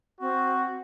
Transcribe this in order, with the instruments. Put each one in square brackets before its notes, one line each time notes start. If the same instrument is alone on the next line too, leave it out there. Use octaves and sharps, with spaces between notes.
[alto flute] C4 [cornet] F#4